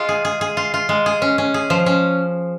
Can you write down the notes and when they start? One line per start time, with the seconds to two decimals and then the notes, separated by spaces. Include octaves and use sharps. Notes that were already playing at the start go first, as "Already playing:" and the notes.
Already playing: G#3 F4
0.09 G#4
0.25 G#4
0.41 G#4
0.57 F4
0.74 F4
0.89 G#3
1.06 G#4
1.22 C#4
1.38 C#4
1.54 G#4
1.70 F3
1.86 C#4